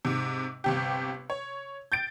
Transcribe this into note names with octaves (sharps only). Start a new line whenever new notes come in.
G#2 C3
G1 C3 G4
C#5
G6 A6 D7